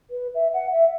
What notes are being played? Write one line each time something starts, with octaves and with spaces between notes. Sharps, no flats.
B4
E5
F#5
E5